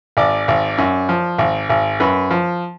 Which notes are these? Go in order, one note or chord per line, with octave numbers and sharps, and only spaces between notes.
G#1 D5
G#1
F#2
F3
G#1
G#1
F#2 B4
F3